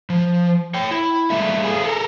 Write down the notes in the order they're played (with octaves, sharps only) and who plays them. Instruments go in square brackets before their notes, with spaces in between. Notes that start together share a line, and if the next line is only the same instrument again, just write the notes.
[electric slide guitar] F3
C#5 G5
E4
G3 A3 A#3 D5 E5
G#4 A4 F5 G#5
A4 A#4